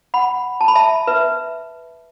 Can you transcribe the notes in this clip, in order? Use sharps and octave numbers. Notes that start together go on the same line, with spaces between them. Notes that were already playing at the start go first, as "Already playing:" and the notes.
F#5 B5
A5
B5
E5 A5
B4 E5